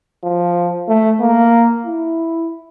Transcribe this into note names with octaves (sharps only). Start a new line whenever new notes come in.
F3
A3
A#3
E4